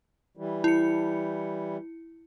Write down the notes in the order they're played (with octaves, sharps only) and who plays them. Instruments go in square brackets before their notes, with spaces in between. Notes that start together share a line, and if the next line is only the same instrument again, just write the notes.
[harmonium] E3 G3
[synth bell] E4 C#7